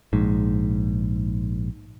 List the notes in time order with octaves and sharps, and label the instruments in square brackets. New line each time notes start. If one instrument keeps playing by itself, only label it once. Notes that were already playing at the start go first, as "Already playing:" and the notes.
[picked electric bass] A#1 G#2